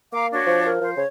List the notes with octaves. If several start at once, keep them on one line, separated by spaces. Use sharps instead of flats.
A#3 F5 A#5 D6
D4 F#4 C#5
F3 C5
A#4
F3 C5
C#3 C#5